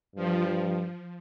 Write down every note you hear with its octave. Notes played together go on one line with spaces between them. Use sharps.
G2 F3